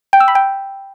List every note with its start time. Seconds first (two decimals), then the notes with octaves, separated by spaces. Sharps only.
0.13 G5
0.20 E6
0.28 B5
0.35 G5